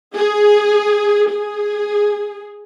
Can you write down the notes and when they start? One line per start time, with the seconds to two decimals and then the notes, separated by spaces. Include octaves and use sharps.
0.15 G#4
1.31 G#4